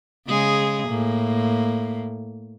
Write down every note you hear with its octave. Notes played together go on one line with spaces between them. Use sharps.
C#3 G#3 G#4
A2 A#3